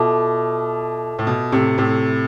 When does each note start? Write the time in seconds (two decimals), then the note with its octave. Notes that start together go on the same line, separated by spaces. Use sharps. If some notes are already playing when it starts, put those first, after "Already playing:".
Already playing: B2 F4 A4 E5 A5 D6
1.19 A2
1.27 B2
1.52 A2 C3
1.78 A2 C3